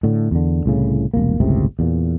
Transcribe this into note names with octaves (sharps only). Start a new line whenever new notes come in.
A2 D3
E2 D3
C2 A2 C#3
E1 C2 A#3
G1 C#2 A2 C3
E2 A#2